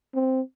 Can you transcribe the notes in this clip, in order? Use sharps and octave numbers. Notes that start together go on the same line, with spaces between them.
C4